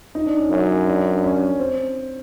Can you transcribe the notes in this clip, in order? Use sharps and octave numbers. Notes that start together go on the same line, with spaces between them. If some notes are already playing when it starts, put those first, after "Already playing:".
D#4
D4
C#4
F#2
D4
D4
C#4
C4